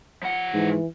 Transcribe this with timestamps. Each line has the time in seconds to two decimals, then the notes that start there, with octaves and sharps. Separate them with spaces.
0.23 F3 F#5
0.54 G#2 E3